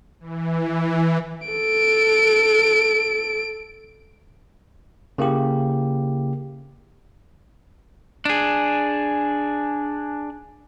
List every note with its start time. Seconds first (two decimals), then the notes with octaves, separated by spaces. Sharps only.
0.20 E3
1.48 A4 D7
5.18 C#3 A#3 E4 G4
8.25 D4 G#4